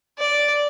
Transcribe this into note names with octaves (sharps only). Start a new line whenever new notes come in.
D5